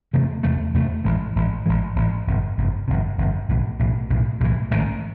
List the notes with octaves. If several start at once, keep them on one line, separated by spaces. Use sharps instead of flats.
E2 C3 E3 A3
E2 C3 E3 A3
E2 C3 E3 A3
A1 G#2 E3
A1 G#2 E3
A1 G#2 E3
A1 G#2 E3
G1 F2 C3
G1 F2 C3
G1 F2 C3
G1 F2 C3
B1 A2 E3
B1 A2 E3
B1 A2 E3
B1 A2 E3
A1 G#2 D#3